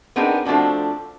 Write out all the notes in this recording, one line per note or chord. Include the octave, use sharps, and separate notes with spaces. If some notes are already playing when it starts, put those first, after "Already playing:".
B3 C4 D4 D#4 G#4 A#4
F3 A3 C4 D4 F#4